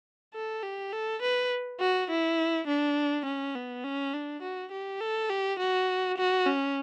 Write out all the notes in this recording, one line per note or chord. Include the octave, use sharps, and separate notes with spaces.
A4
G4
A4
B4
F#4
E4
D4
C#4
B3
C#4
D4
F#4
G4
A4
G4
F#4
F#4
C#4